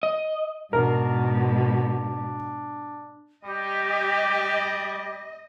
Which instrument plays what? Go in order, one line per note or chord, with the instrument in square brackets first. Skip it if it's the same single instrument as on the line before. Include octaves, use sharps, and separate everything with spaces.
[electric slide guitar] D#5
[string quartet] G#2 B2 [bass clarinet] D4 [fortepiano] A#4
[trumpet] G3 [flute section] G4 [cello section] D#5